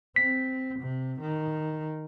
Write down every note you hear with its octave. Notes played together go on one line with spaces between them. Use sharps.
C4 B6
C3
D#3